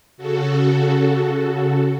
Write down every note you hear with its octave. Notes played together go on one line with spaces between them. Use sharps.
C#3 F#4 A4